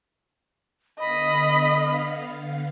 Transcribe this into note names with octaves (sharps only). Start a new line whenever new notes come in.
D3 B3 D#5 F5 B5